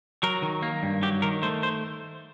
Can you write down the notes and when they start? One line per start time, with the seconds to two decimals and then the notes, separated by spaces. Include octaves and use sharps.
0.23 F#3 A#4
0.42 D#3
0.63 A#3
0.83 G2
1.02 F#3 G4
1.22 D#3 A#4
1.42 A3 C5
1.63 C5